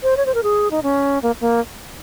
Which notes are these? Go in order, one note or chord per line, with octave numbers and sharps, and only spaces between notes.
C5
C#5
C5
A#4
G#4
D#4
C#4
A#3
A#3